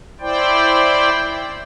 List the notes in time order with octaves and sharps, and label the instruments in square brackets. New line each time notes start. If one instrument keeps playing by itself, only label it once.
[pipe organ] E4 C5 D5 G5